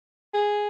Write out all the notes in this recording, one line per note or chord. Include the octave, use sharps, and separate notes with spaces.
G#4